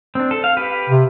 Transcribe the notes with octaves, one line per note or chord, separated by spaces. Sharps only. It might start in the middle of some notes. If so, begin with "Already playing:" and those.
C4 D4
A4
F5
G4 B4
C3